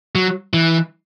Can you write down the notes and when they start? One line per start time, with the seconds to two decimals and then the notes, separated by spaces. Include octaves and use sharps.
0.15 F#3
0.54 E3